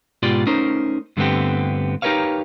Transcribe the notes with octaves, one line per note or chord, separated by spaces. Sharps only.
G#2 B2 F4 G4 D5 C6
A3 C#4 D#4 A#4 C5
G2 D3 A3 B3 C4 G4
D#4 G4 A#4 B4 C#5 F5